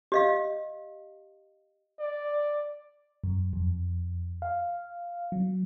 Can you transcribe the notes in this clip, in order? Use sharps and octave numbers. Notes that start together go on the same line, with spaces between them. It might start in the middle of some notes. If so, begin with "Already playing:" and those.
G4 D#5 F5
D5
F#2
F2
F5
F#3